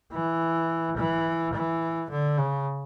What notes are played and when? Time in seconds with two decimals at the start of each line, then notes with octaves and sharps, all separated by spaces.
0.13 E3
0.97 E3
1.54 E3
2.11 D3
2.38 C#3